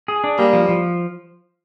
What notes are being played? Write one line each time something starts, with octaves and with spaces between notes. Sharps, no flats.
G#4
D4
G3 A#3
F3
F3